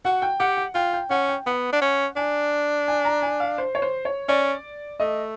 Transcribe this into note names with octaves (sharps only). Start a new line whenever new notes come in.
F#4 F#5
G5
G4 F#5
F#5
F4 G5
G5
C#4 F#5
G5
B3 F#5
D4
C#4
D4 G#5
G#5
A#5
G#5
F5
C5
C#5
C5
C#5
C#4 D5
A3 D#5